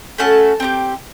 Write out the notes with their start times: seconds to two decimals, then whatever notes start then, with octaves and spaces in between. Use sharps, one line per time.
0.18 A3 C#4 F#4 A4 A5
0.60 C4 D#4 G4